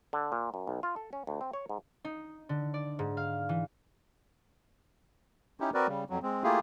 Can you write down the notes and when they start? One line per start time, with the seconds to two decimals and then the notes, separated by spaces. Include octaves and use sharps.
0.13 D3
0.32 A#2
0.54 F#2
0.67 B1
0.83 F4
0.96 A4
1.13 C#4
1.27 D2
1.41 C4
1.53 C#5
1.69 G#2
2.05 D#4
2.49 D3
2.74 D5
2.99 G#2
3.17 F5
3.49 E3
5.60 C#4 D#4 E4 G4
5.74 C4 F#4 A#4 B4 D5
5.88 C#3 G3
6.10 F2 F#3
6.23 G#3 C4
6.43 A3 A#3 E4 F4 G4 G#4